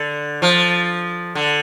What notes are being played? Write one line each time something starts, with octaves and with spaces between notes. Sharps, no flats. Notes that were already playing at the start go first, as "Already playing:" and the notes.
Already playing: D3
F3
D3